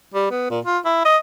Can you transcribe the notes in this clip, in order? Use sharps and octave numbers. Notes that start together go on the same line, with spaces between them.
G3
B3
A#2
F4
E4
D#5